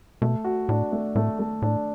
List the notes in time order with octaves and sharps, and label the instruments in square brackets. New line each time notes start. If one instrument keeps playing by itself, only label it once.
[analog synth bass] B2 [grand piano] A3
[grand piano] F#4
[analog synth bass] A2 [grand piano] D4
[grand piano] A3
[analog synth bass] A2 [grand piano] A3
[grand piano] A3
[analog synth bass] A2 [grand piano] D4